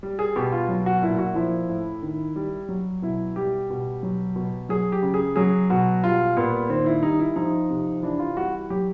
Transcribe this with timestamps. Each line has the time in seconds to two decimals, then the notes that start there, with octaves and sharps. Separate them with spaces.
0.03 G3
0.19 G#4
0.36 B2 G4
0.52 F4
0.69 F#3
0.86 F#4
1.02 A#2 E4
1.19 F#4
1.35 F3 E4
1.69 A2
2.02 D#3
2.36 G3
2.69 F#3
3.02 B2 E4
3.36 G3 G4
3.70 B2
4.03 F#3
4.36 B2
4.69 F#3 G#4
4.92 G4
5.02 C#3
5.14 G#4
5.36 F#3 G#4
5.70 B2 F#4
6.03 G3 F4
6.37 A#2 B3
6.69 D#3 C4
6.86 E4
7.03 G3 D#4
7.19 E4
7.36 F3 D#4
7.70 C3
8.03 E3 D4
8.19 F4
8.37 G3 F#4
8.70 F#3 G4